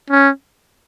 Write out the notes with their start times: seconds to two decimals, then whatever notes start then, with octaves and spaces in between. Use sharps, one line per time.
0.10 C#4